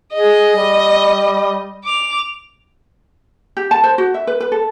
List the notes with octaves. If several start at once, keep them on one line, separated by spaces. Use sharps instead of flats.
G#4 D#5
G3
D6 F7
G4
A5
C5
F#4
E5
B4
B4
A4